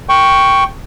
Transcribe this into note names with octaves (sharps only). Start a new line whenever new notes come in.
G5 C#6